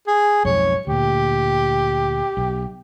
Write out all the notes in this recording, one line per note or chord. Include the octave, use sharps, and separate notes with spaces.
G#4
B1 F2 G#2 C#5
D2 A#2 G4
B1